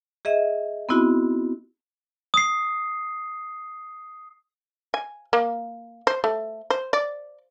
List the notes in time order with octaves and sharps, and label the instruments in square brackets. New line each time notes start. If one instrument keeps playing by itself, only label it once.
[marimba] G#4 D#5 E5
B3 C4 D#4 E4 F#4 B5
[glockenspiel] D#6 C7
[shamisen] G#5
A#3
C5
A3
C5
D5